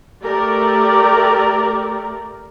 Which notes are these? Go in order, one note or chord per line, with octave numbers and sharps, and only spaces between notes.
A3 G4 A#4 D5